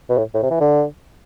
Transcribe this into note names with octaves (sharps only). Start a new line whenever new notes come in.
B2
A2
A2
C3
E3
D3